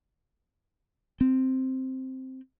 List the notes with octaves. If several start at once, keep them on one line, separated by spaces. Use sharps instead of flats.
C4